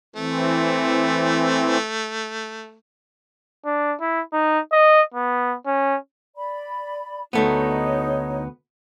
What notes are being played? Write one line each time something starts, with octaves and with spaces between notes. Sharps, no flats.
E3 A3 C4
D4
E4
D#4
D#5
B3
C#4
D5 B5
D2 A3 B3 D#4 C#5